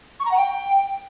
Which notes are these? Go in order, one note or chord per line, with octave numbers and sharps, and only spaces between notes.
C#6
A#5
F#5
G5